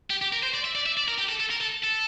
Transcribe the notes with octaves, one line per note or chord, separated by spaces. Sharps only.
G4
G4
A#4
C5
D5
E5
D5
E5
D5
A#4
G4
A4
A4
A#4
A4
A4